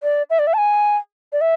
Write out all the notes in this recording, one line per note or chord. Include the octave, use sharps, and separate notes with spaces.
D5
E5
D5
E5
A5
G#5
D5
E5